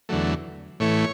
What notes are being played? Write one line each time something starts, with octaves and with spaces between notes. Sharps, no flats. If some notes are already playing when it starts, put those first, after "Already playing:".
E2 D3 F#3 A3
A2 E3 A3 C#5